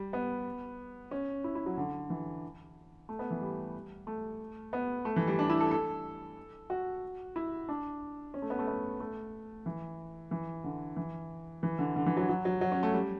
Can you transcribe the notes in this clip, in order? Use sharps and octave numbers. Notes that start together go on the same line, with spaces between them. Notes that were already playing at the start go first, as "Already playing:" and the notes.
Already playing: G3
B3
C#4
E4
E4
F#3
D3
E3
A3
B3
E3
G3
A3
B3
A3
E3
G3
D4
E4
A4
A4
F#4
E4
D4
C#4
A3
B3
A3
B3
A3
E3
E3
D3
E3
E3
D3
D3
E3
F#3
F#3
F#3
F#3
C#4
A3
G3